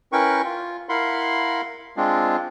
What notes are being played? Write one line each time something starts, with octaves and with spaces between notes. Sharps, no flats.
C#4 E4 A#4 B4 G5 C#6
F4
E4 A#4 F5 F#5 B5 C6
G#3 C4 D4 F4